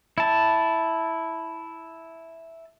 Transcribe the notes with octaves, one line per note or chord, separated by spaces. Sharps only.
E4 A5